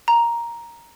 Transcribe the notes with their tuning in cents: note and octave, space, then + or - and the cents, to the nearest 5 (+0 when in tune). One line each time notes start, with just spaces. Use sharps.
A#5 +5